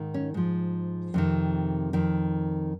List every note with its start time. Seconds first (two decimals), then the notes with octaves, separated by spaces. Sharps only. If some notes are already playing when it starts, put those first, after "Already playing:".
Already playing: G#2 D#3
0.14 C#4
0.34 G#2 F3
1.14 F2 C3 D#3
1.93 F2 D#3